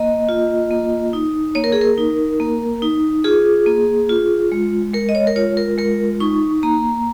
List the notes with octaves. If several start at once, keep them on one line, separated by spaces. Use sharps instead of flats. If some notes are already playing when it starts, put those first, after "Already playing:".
Already playing: A#3 D#5
F4
A#3
D#4
A#3 C#5
A#4
G#4
A#4
D#4
A#3
D#4
F4 G#4
A#3
F4
G#3
G#3 A#4
D#5
C#5
A#4
F4 C#5
A#4
G#3 A#4
D#4 C#6
A#3 A#5